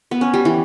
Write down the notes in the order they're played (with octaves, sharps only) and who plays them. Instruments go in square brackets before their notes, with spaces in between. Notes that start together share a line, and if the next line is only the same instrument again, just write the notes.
[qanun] B3
C#4
G3
E3